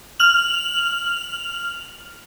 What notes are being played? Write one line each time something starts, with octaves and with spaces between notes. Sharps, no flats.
F6 F7 F#7